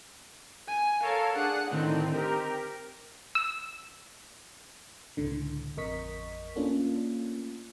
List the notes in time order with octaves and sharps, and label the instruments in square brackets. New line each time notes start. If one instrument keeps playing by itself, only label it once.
[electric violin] G#5
[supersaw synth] A4 C#5 A5 [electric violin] A#4 F5
[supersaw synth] D4 [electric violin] G#4 F#5
[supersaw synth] A2 D3 D#3 [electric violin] C4 D#4
[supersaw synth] G4 A#4
[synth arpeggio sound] E6
[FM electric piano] C#2 A2 D3
A1 F2 A#4 D#5 C#6 B6
A3 A#3 C#4 D4 F4